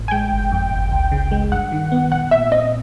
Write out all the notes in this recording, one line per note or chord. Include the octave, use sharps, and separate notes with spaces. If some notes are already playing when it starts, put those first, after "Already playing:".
Already playing: A1 A2
G#5
G#3 G5
G1
F2
G1
C#2
C#3
G#3
G2 F#5
D#3
B3
A#1 F#5
A#2 E5
C4 D#5